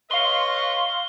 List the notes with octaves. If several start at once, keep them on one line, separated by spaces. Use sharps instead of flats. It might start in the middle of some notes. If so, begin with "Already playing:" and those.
B4 C#5 D#5 F5 C6 C#6 G7